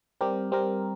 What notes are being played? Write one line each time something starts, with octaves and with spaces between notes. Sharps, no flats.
G3 C4 G4 A#4
G3 C4 G4 A#4